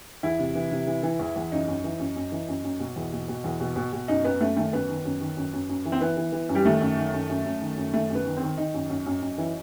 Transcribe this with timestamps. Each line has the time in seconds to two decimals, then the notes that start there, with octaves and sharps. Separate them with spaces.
0.23 E2 E4
0.39 C3
0.55 E3
0.71 C3
0.87 E3
1.03 E3
1.19 E2
1.36 E2
1.52 F#2 D#4
1.68 F#2
1.84 E3
1.99 F#2
2.16 F#2
2.32 E3
2.48 F#2
2.64 F#2
2.80 B2
2.96 E2
3.13 B2
3.28 B2
3.44 E2
3.60 B2
3.76 B2
3.93 B2
4.08 F#2 D#4
4.24 F#2 B3
4.41 F#2 A3
4.56 D#3 A3
4.72 F#2 B3
4.88 D#3
5.05 F#2
5.20 D#3
5.37 F#2
5.53 F#2
5.69 F#2
5.85 E3
5.92 C4
6.01 E3 B3
6.17 E3
6.32 E3
6.49 F#2
6.55 G3
6.65 D#3 A3
6.81 F#2
6.97 D#3
7.13 F#2
7.29 F#2
7.45 F#2
7.61 D#3
7.77 F#2
7.93 D#3 A3
8.10 F#2
8.15 B3
8.26 D#3
8.37 C4
8.42 D#3
8.58 D#3 D#4
8.74 F#2
8.90 F#2
9.06 F#2
9.22 F#2
9.38 E3